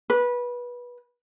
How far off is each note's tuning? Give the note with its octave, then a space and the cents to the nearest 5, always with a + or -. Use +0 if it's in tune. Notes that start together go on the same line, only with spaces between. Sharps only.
B4 -20